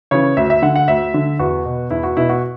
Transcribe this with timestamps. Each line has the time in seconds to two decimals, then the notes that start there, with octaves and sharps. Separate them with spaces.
0.11 C#3 E3 C#5
0.37 D2 E5
0.50 E5
0.62 D3 F#5
0.76 F#5
0.88 D2 E5
1.14 D3
1.39 E2 F#4
1.65 B2
1.91 E2 E4
2.04 F#4
2.16 B2 E4
2.29 F#4